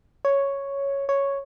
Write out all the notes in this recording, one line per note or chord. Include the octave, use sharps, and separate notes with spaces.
C#5
C#5